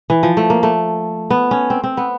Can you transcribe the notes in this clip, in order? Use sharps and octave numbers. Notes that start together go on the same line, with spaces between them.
E3
F3
A3
A#3
A3
B3
C#4
C4
C4
B3